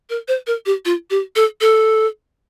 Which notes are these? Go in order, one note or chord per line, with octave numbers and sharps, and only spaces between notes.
A#4
C5
A#4
G4
F4
G4
A4
A4